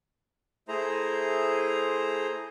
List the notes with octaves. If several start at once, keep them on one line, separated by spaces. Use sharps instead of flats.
A3 E4 G#4 C5 A#5